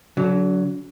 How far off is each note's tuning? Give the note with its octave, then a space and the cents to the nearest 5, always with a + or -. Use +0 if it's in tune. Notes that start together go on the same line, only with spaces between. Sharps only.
D3 -40 F#3 +0